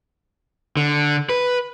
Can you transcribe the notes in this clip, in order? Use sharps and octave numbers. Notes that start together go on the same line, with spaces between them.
D3
B4